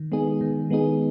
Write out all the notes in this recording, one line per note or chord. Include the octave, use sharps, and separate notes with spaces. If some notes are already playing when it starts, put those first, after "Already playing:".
Already playing: D#3
G#3 B3 D#4 G#4
D#3
G#3 B3 D#4 G#4